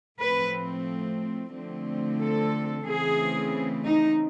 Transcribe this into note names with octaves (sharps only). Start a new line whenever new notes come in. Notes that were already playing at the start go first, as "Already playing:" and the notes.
A2 F3 A3 C4 B4
D3 F3 A3 C4
A4
C#3 E3 A3 C4 G#4
D#4